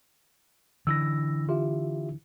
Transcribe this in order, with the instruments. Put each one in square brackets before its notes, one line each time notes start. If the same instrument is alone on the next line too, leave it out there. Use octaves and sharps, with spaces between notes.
[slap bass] D3 E3 [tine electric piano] E6 A#6
[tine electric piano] F4 G4 E5